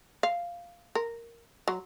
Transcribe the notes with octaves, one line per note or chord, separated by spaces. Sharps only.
F5
A#4
F#3